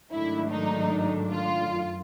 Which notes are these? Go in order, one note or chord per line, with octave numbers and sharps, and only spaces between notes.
G#2 D#3 F#3 A3 D4 E4
D#4
F4
F#2